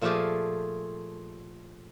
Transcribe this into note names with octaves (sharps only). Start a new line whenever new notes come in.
A#2 F3 A3 F4 G4 G#4